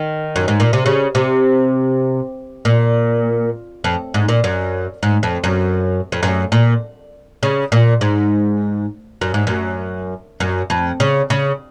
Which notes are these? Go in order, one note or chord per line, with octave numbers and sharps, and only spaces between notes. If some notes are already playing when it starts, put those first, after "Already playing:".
Already playing: D#3
F#2
G#2
A#2
C3
C#3
C3
A#2
F2
G#2
A#2
F#2
G#2
F2
F#2
F2
F#2
A#2
C#3
A#2
G#2
F#2
G#2
F#2
F#2
F2
C#3
C#3